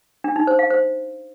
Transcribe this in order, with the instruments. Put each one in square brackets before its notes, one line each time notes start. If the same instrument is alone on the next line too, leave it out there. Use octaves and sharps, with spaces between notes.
[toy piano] D4
D#4
C5
F5
C5